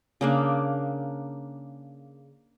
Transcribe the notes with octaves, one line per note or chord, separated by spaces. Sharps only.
C#3 A#3 D4